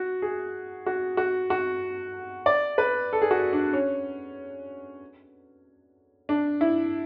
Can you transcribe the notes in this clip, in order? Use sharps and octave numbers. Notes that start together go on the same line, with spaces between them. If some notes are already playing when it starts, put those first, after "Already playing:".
Already playing: F#4
G#4
F#4
F#4
F#4
D5
B4
A4
G#4
F#4
D4
C#4
D4
E4